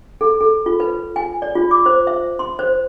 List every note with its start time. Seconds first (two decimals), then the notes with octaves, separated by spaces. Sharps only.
0.21 A4
0.41 A4
0.66 F4
0.80 B4
1.16 G#5
1.42 D5
1.55 F4
1.71 D6
1.86 C5
2.07 E5
2.39 C6
2.59 C5